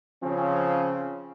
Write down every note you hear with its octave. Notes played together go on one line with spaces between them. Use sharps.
C#3 F3 C4 C#4